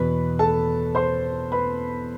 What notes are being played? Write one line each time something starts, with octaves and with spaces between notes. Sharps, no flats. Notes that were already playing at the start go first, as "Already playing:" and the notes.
Already playing: E2 B2 B3 B4 B5
A4 A5
C5 C6
B4 B5